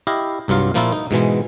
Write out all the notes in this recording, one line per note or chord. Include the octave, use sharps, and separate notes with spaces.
E4 G4 D#5 F5
C2 G2 F#3 F4 F5
A#2 F3 A#3 E4 F4
D#4
G#2 B2 E3 G#3